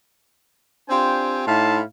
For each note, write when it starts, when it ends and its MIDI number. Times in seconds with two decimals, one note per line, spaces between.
0.89 1.41 60
0.89 1.41 62
0.89 1.41 65
0.89 1.41 67
0.89 1.41 72
0.89 1.41 80
1.46 1.81 45
1.46 1.81 63
1.46 1.81 64
1.46 1.81 77
1.46 1.81 81
1.46 1.81 84